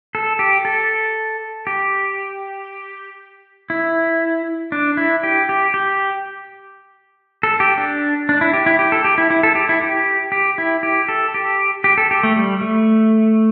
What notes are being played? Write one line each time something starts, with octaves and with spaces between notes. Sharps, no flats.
A4
G4
A4
G4
E4
D4
E4
G4
G4
G4
A4
G4
D4
D4
E4
G4
E4
G4
A4
G4
E4
E4
A4
G4
E4
G4
G4
E4
G4
A4
G4
G4
A4
G4
A3
G3
A3